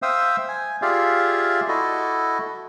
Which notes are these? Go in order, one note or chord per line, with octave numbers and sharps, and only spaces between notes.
C5 E5 F5 G5 D#6 E6
G#5
F4 G4 G#4 D5 E5 F5
E4 F#4 A4 D#5